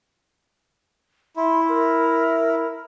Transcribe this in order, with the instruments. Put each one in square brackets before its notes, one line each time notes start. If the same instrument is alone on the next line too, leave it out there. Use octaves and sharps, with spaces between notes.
[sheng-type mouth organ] E4 [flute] C6
[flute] A#4